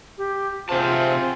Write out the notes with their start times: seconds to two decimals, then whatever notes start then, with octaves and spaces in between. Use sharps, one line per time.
0.18 G4
0.69 C3 C4 F4 G#4 C5 A5